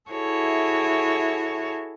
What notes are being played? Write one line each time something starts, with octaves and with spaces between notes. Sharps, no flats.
E4 F#4 G#4 A4 C#5 E5